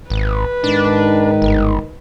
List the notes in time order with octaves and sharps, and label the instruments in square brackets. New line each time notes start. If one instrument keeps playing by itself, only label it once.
[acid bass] G#1 [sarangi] B4
[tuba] G#2 [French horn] D#3 [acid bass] D4
[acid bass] G1